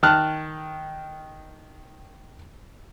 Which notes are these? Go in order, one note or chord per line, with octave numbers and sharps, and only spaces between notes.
D#3 A5 F6 F#6